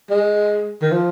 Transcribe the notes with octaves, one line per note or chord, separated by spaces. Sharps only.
G#3
D#3
F3